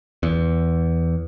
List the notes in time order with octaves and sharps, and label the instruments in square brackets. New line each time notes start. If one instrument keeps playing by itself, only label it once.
[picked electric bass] E2